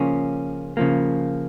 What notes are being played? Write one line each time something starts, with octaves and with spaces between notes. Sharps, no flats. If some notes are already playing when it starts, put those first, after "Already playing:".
Already playing: C#3 F3 A#3 C#4
C#3 F3 A#3